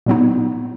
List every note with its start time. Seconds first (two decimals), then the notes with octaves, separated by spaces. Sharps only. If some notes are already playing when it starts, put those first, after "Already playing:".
0.06 A#2 F#3 B3 D#4